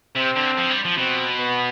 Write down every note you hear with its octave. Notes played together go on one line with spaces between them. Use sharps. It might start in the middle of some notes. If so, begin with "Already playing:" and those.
C3 C4
D3
F3
G3
F3
B2 C4
B3